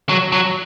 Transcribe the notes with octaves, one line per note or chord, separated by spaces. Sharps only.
F#3
F#3